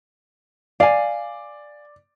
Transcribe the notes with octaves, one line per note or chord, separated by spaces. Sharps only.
D5 F5 G#5